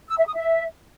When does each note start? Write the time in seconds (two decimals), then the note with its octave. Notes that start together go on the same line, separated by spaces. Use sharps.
0.09 E6
0.18 E5
0.27 D#6
0.35 E5